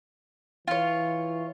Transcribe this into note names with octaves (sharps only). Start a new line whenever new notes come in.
E3 F4 C#5